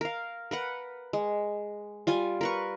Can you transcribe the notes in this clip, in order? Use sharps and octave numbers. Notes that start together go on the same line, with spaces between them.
A#4 F5
A#4 B4 F#5
G#3
G3 F4 G#5
A#4 B4 C#6